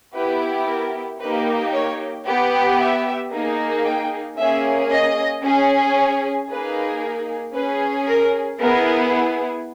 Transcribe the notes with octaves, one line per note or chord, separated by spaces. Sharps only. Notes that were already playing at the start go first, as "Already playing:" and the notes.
B3 E4 G4 B4
A#4
A#3 D#4 G4 B4
C#5
B3 G4
E5
A#3 D#4 G#4
G5
A#3 C#4 G#4 E5
D#5
C#4 G#4
C#5
A#3 D#4 G#4 B4
C#4 G#4 B4
A#4
B3 E4 G#4 A#4